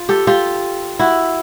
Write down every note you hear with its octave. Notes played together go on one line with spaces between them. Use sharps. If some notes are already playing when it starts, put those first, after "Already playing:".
Already playing: F4
G4 A4
F4 G4
E4 F#4